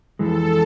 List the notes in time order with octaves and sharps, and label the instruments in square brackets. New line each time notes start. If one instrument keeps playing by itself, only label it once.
[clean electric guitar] F2 E3 G#3 [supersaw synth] A4